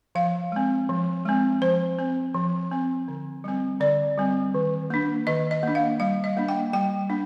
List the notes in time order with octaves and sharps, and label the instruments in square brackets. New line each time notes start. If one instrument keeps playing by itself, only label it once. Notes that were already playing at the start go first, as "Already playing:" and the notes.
[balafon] F3 F5
G#3 C4
F3
G#3 C4
F3 C5
C4
F3
C4
D3
G3 C4
D3 D5
G3 C4
D#3
A#3 D4
D#3 D#5
D#5
A#3 D4
F5
G3 F5
D#5
A#3 D4
G5
G3 G5
A#3 D4